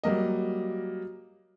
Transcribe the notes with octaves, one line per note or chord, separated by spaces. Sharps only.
F#3 G3 A#3 D#5